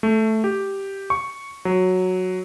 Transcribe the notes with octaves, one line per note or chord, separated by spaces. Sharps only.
A3
G4
C#6
F#3